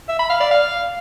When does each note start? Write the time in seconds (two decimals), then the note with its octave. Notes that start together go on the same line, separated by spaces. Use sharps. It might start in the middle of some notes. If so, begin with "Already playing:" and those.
0.08 E5
0.19 B5
0.30 F5
0.40 D5
0.51 F5